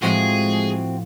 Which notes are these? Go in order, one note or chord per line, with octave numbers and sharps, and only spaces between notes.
A2 F3 G#3 C4 F#4 G#4